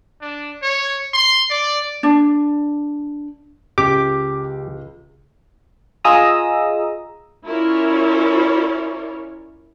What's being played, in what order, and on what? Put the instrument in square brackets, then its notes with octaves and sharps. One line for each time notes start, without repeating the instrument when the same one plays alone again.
[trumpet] D4
C#5
C6
D5
[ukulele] D4
[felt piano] C#2 [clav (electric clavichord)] G4 [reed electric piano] D6
[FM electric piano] F4 G#4 D#5 A#5 D#6 E6
[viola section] C#4 E4 F4 A#4 C#5 D5